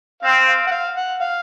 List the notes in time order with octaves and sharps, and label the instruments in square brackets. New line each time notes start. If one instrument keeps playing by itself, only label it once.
[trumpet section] C4 [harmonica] F5
[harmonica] F5
F#5
F5
F#5
F5